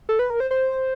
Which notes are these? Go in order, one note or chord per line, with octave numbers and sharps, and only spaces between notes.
A4
B4
A#4
C5
C5